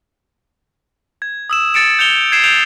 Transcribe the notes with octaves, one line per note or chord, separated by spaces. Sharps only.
G#6
D#6 E6 E7
A6 C#7 D7 E7
G6 C#7 F7 G7
G#6 C7 D7 E7
G6 C7 D7 F7